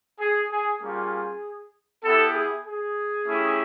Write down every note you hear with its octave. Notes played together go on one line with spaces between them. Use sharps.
G#4
G#4
G3 A#3 C#4 F4 G#4
B3 E4 G4 A4
G#4
G#4
A3 C#4 E4 G4